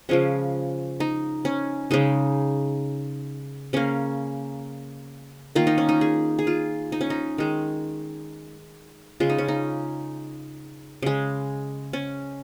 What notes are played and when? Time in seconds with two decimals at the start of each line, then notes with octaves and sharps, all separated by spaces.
0.09 C#3 F3 G#3 C#4
1.00 D#4
1.45 C#4
1.91 C#3 G#3 D#4
3.73 C#3 A#3 C#4
5.55 D#3 A#3 F4
5.67 D#4
5.78 C#4
5.89 D#4
6.01 G#4
6.39 G#4
6.47 F4
6.92 D#4
7.01 C#4
7.10 D#4
7.38 D#3 G#3
9.20 C#3 G#3 F4
9.30 D#4
9.38 C#4
9.48 D#4
11.02 C#3 G#3
11.93 C#4